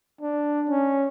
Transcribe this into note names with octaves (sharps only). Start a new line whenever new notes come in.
D4
C#4